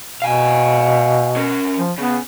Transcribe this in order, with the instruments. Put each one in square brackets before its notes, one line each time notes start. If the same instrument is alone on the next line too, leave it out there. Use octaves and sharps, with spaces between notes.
[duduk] B2 [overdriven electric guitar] F5 G#5
[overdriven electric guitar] C#4 A#4
[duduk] F3
[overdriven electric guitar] C#3 [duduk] B3